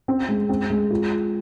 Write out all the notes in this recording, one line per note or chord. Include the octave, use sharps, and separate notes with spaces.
C4
G#3
C4
G#3
F4